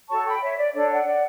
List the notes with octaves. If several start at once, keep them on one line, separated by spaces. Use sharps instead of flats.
F#4 A4 C#5 A5 C#6
G5 B5
C#5 E5
D5
D4 A4 C#5 D5
D5 F#5
D5 F#5